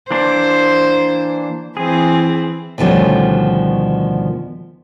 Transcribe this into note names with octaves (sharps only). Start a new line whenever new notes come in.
E3 A#3 D4 C5
E3 C4 G#4
D2 B2 D#3 F3 G3 C#4